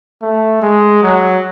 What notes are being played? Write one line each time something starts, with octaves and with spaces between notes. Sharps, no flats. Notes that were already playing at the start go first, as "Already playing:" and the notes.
A3
G#3
F#3